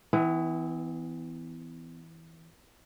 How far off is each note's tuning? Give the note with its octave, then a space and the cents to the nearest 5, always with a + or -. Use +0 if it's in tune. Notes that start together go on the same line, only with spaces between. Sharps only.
E3 -10 B3 +35